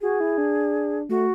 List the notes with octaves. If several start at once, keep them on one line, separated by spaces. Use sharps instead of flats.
F#4 G#4
E4
D4
A3 F#4